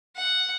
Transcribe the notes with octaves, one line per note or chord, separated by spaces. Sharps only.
F#5